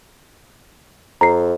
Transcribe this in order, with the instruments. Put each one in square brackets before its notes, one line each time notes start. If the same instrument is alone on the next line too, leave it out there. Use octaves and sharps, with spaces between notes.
[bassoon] F2 [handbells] A#5 C7